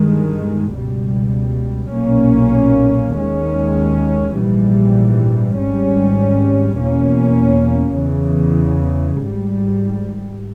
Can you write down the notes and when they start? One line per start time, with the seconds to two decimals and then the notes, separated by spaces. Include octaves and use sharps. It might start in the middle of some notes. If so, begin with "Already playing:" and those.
Already playing: G1 G2 D#3 G#3
0.74 C#2 B2 G3
1.94 B1 A#2 A#3 C#4
3.15 D#2 D#3 G#3 C#4
4.36 A#1 G#2 E3 G3
5.57 G#1 G#2 G3 C#4
6.78 E2 B2 A#3 C#4
7.98 E2 C#3 E3
9.19 G#1 G#2 G3